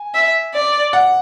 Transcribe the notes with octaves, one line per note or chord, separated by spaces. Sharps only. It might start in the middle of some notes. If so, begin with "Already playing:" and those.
Already playing: G#5
E5
D5
F#5